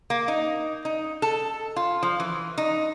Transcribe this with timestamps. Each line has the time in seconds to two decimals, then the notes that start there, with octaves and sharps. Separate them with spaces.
0.10 A#3
0.28 D#4
0.85 D#4
1.22 A4
1.76 F4
2.03 F3
2.20 E3
2.58 D#4